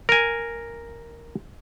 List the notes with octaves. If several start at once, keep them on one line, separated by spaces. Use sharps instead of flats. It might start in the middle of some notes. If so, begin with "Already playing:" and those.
A#4 G#5